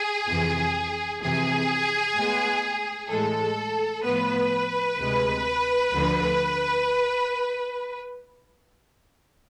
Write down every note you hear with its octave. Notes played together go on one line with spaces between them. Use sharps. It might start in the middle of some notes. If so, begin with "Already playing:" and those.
Already playing: G#4
F2 C3 E3
F2 C3 E3 G#4
A2 G#3 B3
A2 E3 G#3 A4
A2 F3 B3 B4
D2 C3 G#3
D2 D3 F3